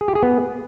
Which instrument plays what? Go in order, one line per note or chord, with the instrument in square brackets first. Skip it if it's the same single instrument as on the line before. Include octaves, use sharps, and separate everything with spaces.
[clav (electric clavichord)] G#4
G4
G#4
B3